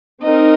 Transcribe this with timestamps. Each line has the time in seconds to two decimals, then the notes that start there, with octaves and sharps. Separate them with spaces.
0.23 C4 D#4 A#4 D#5